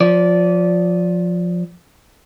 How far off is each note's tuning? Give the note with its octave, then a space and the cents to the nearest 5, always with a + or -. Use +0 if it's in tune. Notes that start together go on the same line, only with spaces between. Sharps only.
F3 +20 D5 -20